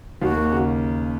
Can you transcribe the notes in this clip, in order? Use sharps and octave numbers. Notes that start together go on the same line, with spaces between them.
D#2 F#4
A#3
C#3